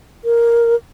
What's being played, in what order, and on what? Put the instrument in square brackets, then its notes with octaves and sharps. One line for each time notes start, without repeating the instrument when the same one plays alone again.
[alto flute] A#4